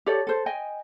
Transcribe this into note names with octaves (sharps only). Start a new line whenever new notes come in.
G4 A4 C#5 D5
A4 C5
D#5 G5 G#5